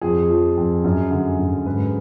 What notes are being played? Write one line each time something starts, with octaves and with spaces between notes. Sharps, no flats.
F2 G#4
F3
F2
F#2
D3
F#2
G#2 B4